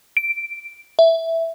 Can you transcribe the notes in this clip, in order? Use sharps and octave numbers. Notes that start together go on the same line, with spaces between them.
D7
E5